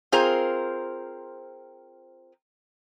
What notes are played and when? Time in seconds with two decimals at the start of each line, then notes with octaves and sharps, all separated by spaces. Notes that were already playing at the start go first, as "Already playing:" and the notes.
0.12 C4 F4 G#4 A#4 C5 A#5